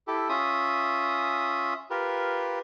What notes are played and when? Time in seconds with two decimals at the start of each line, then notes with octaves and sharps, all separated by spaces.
0.08 E4 G4 A4
0.29 C#4 F4 E5 D#6
1.90 F4 G4 A#4 B4